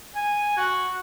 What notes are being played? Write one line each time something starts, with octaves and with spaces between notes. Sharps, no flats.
G#5
F#4